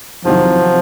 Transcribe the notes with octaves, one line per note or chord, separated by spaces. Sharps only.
E2 C3 D#3 F3 F#3